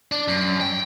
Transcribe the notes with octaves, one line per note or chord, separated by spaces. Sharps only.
D4
F#2
G5